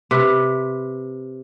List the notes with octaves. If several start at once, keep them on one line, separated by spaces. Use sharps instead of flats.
C3 B4